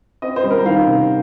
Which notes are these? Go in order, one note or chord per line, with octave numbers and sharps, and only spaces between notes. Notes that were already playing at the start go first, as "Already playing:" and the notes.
C4 D#5
C5
G3
A#4
D#3 F5
C3